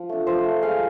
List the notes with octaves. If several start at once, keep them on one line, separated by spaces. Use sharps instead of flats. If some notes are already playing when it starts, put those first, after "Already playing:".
Already playing: F3
A3 D4
F3 C5
A3 D4
G#3 F5